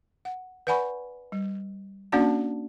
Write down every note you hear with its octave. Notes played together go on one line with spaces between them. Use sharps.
F#5
B4 D5 F#5 G#5 B5 C#6
G3
A#3 C#4 D4 F#4 D5 A5